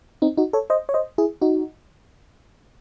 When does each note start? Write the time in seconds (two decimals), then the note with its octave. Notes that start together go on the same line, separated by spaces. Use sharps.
0.22 C4 D#4
0.37 D#4 F#4
0.53 A4 C#5
0.70 C5 D#5
0.89 C#5
0.94 C5 D#5
1.18 E4 G#4
1.41 D#4 F#4